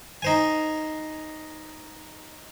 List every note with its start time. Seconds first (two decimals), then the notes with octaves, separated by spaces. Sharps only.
0.22 D#4 C5 G#5